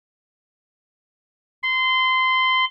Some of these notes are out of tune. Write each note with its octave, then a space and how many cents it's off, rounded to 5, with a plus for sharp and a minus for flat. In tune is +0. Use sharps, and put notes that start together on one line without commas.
C6 -20